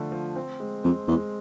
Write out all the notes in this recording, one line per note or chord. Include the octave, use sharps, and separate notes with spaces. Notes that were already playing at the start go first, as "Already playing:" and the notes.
Already playing: D3 F3 A3
F3
C4
G#3
F2 C4
E2 G#3